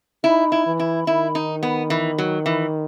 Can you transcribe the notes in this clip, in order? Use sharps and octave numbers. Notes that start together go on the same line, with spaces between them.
D#4 E4
E4
E3
E4
D#3 E4
D#4
B3
E3
F#3
E3